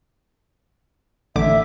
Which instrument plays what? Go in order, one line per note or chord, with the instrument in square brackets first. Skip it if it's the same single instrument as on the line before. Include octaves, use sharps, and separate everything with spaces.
[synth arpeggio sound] A1 D3 D6 [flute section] E5